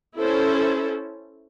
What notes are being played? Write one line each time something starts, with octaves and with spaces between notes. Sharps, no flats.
C#4 E4 A4 C5